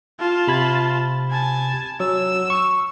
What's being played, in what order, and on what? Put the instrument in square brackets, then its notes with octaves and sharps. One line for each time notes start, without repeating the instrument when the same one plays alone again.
[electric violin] F4 A5
[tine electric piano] C3 B5 G#6
[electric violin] G#5 A5
[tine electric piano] F#3 [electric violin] E6
[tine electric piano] C#6